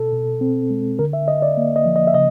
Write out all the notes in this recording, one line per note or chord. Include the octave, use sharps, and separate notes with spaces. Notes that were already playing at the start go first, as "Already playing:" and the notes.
Already playing: B2 A4
B2
C4
G#3
D3 A#4
E5
D3 D#5
D5
A#3
D#5
F3
D#5
E5
C#3 D#5